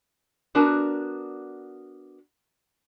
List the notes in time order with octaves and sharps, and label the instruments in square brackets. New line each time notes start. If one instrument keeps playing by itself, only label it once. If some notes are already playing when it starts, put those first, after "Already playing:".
[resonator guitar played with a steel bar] B3 D4 F#4 A#4 A5